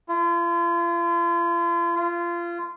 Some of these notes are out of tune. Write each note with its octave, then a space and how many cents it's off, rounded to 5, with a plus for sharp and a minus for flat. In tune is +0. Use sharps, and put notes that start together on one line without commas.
F4 -40
F4 -25